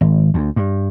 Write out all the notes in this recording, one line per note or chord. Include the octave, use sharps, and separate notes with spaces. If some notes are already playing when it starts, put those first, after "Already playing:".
G#1
D2
G2